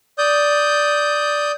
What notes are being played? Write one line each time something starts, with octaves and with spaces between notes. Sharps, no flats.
D5 D#6 G6